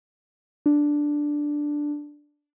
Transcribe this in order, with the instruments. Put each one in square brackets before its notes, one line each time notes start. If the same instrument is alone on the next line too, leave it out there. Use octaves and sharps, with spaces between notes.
[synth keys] D4